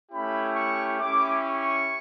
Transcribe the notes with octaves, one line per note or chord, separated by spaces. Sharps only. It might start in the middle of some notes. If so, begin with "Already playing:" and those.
A3 C#4 E4 G4 B5
C#6
C#4 E4 G4 D6
C#6